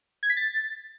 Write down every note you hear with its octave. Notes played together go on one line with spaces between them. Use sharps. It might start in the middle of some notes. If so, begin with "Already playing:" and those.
G#6
B6
A6